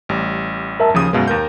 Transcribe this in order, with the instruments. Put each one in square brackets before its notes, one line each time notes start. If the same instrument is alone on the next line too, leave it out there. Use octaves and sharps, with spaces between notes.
[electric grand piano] A1 G3
[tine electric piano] A#4 E5 A5
[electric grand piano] D#2 C#3 D#6 [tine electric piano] F3
[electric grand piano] F#2 B2 G#3 [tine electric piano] B4 F5
[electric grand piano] D#2 A#4 G6